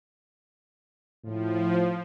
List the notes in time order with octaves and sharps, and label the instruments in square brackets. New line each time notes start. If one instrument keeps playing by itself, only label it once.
[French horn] A2 [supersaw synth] F3